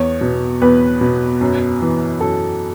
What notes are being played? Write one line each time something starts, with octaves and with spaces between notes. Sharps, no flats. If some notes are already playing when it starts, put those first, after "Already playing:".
Already playing: E2 C#5
B2
E2 B4
B2
F#2
E3
F#2 A4